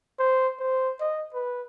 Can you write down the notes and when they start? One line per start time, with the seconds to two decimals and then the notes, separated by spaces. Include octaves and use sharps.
0.19 C5
0.59 C5
1.00 D#5
1.34 B4